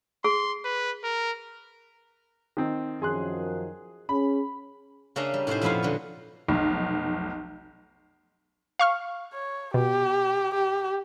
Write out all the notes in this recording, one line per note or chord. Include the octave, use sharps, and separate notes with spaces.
G#4 C6
B4
A#4
D#3 C4
F#2 D#3 F3 G#4 C6 F#6
C#4 G#4 B5
C#3 A#3 C#4 D4 E5 A#5
G3
A2 C3 C#4 D#4 E4 C5
F2 A#2 F3 B3 E4 F5
D3 F#3 F#4
F1 B1
F5 C#6 F6
C#5
B2 G4
G4